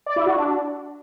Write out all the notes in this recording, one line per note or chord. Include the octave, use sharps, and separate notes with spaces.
D5
E4
F#4
D4